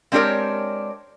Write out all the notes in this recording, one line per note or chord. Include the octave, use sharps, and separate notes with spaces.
G#3 C4 D4 G4 A#4 C#5